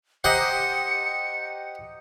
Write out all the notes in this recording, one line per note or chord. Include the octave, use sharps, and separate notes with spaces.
G4 C5 D#5 F#5 A#5 C#7